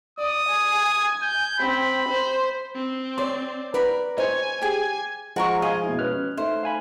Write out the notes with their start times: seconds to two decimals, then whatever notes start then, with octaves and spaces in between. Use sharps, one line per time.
0.19 D5 D#6
0.49 G#5
1.22 G6
1.60 C4 B5
2.09 C5
2.76 C4
3.18 C#5 D5 C6
3.74 A#4 B4 D5 B5
4.18 C5 C#5 D#5 G#5
4.62 G4 G#4 G#5
5.36 F3 G#3 F#4 A#4 C#6
5.62 D#5 F5 G#5 G#6
5.84 B2 E4
5.99 C#4 B4 F6 F#6
6.37 A3 D#4 C5 E5
6.63 F5 G#5 B5